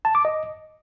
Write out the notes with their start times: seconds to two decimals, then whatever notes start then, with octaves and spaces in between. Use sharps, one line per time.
0.05 A5
0.15 D6
0.25 D#5